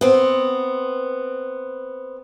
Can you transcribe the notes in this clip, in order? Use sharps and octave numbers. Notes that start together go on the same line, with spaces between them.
B3 C4